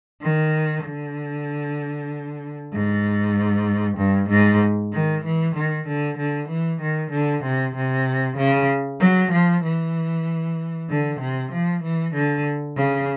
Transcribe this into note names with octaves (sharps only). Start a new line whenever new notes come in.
D#3
D3
G#2
G2
G#2
D#3
E3
D#3
D3
D3
E3
D#3
D3
C3
C3
C#3
F#3
F3
E3
D3
C3
F3
E3
D3
C#3